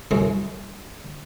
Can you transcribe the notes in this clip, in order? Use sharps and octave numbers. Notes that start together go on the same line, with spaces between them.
C2 F#2 E3 G#3